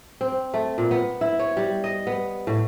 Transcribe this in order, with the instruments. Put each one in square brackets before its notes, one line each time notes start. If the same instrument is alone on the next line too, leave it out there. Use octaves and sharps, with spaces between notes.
[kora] C4
A3
A#2
B3
E4
C#5
G3
D#5
B3
A2